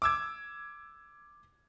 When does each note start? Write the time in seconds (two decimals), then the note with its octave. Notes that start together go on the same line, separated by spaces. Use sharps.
0.02 D6 E6 G#6